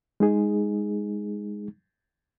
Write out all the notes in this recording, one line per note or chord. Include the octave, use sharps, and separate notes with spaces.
G#3 D#4 G#4